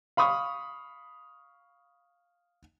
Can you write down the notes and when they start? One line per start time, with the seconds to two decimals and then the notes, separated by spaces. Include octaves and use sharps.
0.17 F5 B5 C#6 D#6